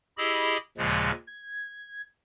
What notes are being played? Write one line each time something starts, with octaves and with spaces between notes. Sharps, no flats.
E4 G4 G#4 D#5 B5 E6
D#2 A#2 C#3 F3 G#3
G#6